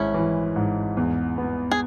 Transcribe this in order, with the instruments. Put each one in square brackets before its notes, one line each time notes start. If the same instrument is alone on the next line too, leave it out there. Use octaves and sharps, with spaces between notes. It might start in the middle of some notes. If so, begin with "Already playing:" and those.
Already playing: [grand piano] G#1 G#3 [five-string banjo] C#4 E4
[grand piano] E3
G#2
E2
B3
[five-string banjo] G#4